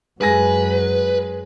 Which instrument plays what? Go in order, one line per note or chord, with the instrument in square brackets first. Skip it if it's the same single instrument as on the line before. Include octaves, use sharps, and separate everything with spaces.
[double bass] F#2 [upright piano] G#3 G#5 A#6 [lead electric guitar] B4